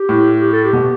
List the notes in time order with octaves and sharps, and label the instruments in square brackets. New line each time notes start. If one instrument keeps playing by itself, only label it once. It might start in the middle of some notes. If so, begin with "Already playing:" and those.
Already playing: [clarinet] G4
[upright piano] A2
[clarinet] G4
A4
G4
[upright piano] B2